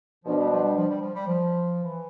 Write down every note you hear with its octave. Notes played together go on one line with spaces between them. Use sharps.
B2 F3 B3 D4
G3
F3
G3
F3
G3
F3
G3
F3
E3